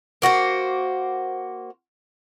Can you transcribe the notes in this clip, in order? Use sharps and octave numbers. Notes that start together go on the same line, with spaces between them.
A#3 F#4 G4 C5